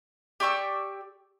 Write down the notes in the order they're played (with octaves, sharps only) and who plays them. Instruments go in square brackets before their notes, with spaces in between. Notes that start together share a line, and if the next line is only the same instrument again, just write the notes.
[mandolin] G4 D5 C#6 E6